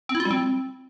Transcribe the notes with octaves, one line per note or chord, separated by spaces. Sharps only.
C4
E4
F4
G3
C4